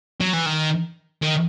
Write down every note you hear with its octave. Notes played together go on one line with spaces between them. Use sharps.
F#3
E3
D#3
D#3